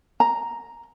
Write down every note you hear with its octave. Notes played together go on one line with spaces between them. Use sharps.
A#5